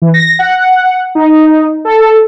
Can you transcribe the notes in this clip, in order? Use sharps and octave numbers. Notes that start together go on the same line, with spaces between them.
E3
A#6
F#5
D#4
A4